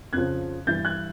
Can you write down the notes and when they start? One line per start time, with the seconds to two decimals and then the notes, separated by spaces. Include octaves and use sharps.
0.13 F2 C#3 F3 F#6 G#6
0.67 G2 E3 G6 A6
0.85 F#6 G#6